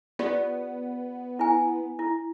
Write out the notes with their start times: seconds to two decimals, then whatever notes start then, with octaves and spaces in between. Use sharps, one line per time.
0.19 B3 F4 G4 D5
1.39 E4 G#5
1.99 E4